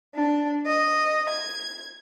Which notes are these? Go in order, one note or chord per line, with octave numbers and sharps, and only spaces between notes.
D4
D#5
G#6